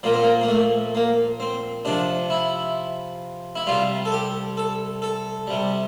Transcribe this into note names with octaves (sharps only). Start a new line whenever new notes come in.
A#2 F3 A#3
C4
A#3
A#3
A3
A#3
C4
C3 F3 D4
E4
E4
C3 G3 F4
A4
G4
A4
A4
C3 G3